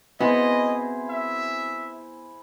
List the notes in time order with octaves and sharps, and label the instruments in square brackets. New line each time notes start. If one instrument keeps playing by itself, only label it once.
[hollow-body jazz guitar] B3 [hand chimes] C4 F#4 [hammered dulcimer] E4 G#4 C5 [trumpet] D#5
[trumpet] E5